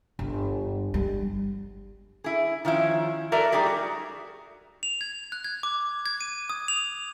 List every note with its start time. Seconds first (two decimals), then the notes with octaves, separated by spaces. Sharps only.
0.19 G1
0.94 G3
2.24 E4 G#4
2.65 D#3 F3 C#4 E4
3.32 F#4 A4 A#4 D5 E5
3.52 G3 A3 D#4 G4 G#4 D5
3.66 F#4
4.83 F7
5.01 G#6
5.32 F#6
5.44 G#6
5.63 D6
6.06 G#6
6.21 D#7
6.50 D#6
6.68 F7